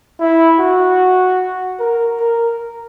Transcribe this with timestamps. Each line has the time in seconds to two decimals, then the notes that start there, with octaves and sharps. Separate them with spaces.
0.20 E4
0.60 F#4
1.80 A#4
2.20 A#4